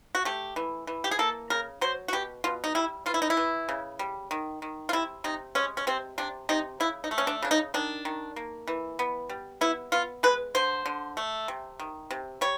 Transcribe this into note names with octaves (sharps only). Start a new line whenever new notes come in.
F#4
A3 G4
E3
E3
G4
G#4
A#3 A4
C#3 A#4
F#3 C5
F#4
B2 G4
B2 F4
D#4
G3 E4
E3 F4
E4
D#4
E4
E3
C#3
G3
D#3
D#3
F4
C3 E4
C3 D#4
G#3 C#4
C#4
C3 C4
C3 D4
C3 D#4
C#3 E4
D#4
A3
C#4
D4
C#3 D4
D#4
D#3 D4
D#3
A#3
E3
B3
G3
B3 E4
B3 F4
G#3 B4
D3 C5
D3
A3
C3
D#3
C3
G3 C#5